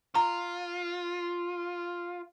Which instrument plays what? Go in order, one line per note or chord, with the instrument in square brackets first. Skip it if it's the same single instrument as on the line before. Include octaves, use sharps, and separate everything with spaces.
[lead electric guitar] F4 [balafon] A#5